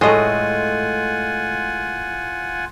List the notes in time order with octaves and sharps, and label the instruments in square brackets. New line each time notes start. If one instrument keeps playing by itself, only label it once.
[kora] A2 A3 [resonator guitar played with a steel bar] G#3 D#5 [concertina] F4 F#5 G#5